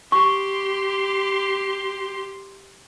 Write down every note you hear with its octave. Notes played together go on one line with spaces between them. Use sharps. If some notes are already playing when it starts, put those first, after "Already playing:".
G4 C6 C#6